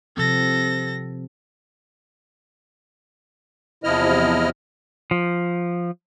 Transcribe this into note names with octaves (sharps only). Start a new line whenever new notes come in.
C3 F3 C4 A4 A#6
E2 C3 F3 E4 D#5 F6
F3